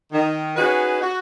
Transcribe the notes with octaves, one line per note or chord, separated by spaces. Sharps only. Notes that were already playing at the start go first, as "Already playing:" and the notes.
D#3
C#4 D#4 F#4 G#4 B4
F#4